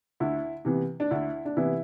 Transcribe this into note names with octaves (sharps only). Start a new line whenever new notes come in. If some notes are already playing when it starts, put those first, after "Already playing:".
D2 E4
C3 E3 B3
D4
D2 E4
D4
C3 E3 B3 E4